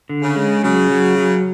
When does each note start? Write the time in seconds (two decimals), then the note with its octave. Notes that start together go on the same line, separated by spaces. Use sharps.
0.09 D3
0.22 C#3
0.36 G#3
0.63 C#3 F#3
0.91 F#3
1.18 F#3